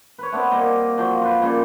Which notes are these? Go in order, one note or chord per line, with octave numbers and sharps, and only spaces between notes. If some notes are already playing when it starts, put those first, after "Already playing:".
B4 C#5
A3 B3 C4 D4
G3 A#3 D#5
F3 F#3 G5
F4 B4
C#3 F3 G3 A#3